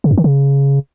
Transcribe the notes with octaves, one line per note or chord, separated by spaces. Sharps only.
C#3
F#2
D#3
C#3